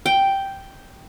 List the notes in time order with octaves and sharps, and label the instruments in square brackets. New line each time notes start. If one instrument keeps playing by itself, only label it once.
[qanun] G5